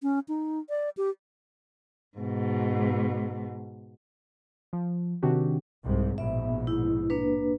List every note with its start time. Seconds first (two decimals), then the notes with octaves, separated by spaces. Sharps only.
0.03 C#4
0.28 D#4
0.69 D5
0.97 G4
2.17 G#2 B2
4.73 F3
5.22 C3 D#3 C4 D4 F#4 G4
5.85 C2 G#2 C3
6.18 A#1 G#2 B2 B3 E5
6.67 E4
7.10 A#3 D4 B4